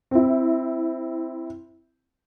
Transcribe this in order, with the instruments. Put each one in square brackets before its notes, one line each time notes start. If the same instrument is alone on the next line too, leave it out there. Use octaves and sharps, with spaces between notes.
[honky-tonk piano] C4 E4